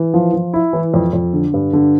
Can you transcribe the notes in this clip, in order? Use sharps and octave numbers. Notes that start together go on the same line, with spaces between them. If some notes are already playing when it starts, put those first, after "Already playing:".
Already playing: E3
F3
F3
E4
E3
F2
F2
D3
G2
D3